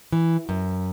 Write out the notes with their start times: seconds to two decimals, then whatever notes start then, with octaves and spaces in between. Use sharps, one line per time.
0.12 E3
0.49 F#2